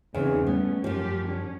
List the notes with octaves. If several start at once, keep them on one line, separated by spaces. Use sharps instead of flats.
E2 C#3 C4 D#4
G3 A3 B3 C#4
F#2 F3 G4
D3 C#4